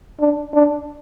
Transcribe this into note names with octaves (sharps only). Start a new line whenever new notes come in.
D4
D4